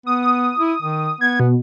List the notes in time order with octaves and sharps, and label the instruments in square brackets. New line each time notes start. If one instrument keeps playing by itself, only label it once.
[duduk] B3 [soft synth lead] D#6
[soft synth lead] D#6
[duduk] E4
D#3
[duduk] B3 [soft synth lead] G#6
[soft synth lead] B2